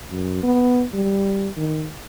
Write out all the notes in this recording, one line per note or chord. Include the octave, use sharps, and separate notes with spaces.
F#2
B3
G3
D#3